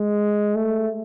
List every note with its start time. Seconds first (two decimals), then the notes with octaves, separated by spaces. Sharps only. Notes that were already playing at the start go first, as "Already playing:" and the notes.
Already playing: G#3
0.55 A3